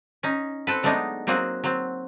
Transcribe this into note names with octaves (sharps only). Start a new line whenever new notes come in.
C#4 D#4
C4 A4 B4
F#3 G#3 A3 B3 D4 D#4
F#3 A#3 C4 F#4 G#4
F#3 C4